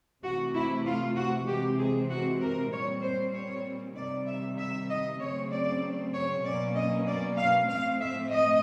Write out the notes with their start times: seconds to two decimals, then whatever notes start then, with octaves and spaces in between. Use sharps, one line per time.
0.23 C3 E3 A3 F#4
0.54 E4
0.86 F4
1.16 F#4
1.47 C3 E3 G#3 C4 G4
1.79 G#4
2.09 F#4
2.41 A#4
2.72 A#2 G3 C4 C#5
3.02 C5
3.35 C#5
3.96 C3 D#3 G3 D5
4.27 E5
4.58 E5
4.90 D#5
5.20 C#3 F#3 A3 C4 C#5
5.52 D5
6.14 C#5
6.44 B2 F#3 A#3 C#4 D5
6.75 D#5
7.07 D5
7.38 F5
7.68 A2 F3 A3 C4 F5
8.00 E5
8.31 D#5